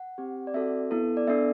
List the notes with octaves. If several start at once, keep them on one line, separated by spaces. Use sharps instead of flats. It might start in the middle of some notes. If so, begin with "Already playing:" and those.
Already playing: F#5
C4 G4
D5
C4 F#4 A4 E5
B3 E4 A4
D5
B3 D4 A4 E5